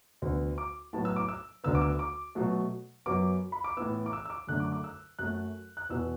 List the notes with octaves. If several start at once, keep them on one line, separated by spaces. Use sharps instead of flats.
D2 D3 B3
D6
A2 F#3 B3 A5
E6
D6
E6
D2 D3 B3 E6
D6
E6
D6
B2 F#3 A3
F#2 F#3 B3 D6
B5
D6
A2 E3 B3 E6
D6
E6
E6
D6
F#2 D3 A3 F#6
D6
D6
E6
F#2 F#3 A3 F#6
F#6
E2 B2 B3 E6